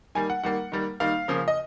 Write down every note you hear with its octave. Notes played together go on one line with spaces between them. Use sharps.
D#3 G3 A#3 G#5
F#5
D#3 G3 A#3 F#5
D#3 G3 A#3
D#3 G3 A#3 F5
C#3 F3 A#3
D#5